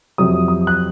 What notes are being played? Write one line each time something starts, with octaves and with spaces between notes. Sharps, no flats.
F2 C3 F#3 D#6
D#6
F#6